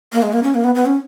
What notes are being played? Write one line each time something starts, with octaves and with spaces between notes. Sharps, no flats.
A#3
G#3
A#3
C#4
A#3
B3
B3
C#4